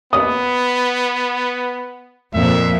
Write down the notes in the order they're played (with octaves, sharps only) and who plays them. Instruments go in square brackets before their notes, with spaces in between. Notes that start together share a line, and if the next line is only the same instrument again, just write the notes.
[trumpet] B3 [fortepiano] D#6
[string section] F2 A#2 F3 [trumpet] E5